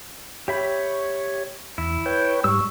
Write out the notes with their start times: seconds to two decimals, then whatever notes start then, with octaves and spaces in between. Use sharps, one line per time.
0.48 G4 C#5 E5 B5
1.78 E2 E4
2.06 B4 C#5 G5
2.44 G#2 G3 C#6 E6